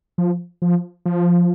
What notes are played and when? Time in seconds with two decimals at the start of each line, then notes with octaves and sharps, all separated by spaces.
0.18 F3
0.62 F3
1.06 F3